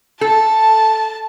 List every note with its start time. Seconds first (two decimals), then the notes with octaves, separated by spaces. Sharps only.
0.21 A4 A5